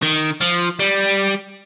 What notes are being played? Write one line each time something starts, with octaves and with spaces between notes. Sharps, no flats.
D#3
F3
G3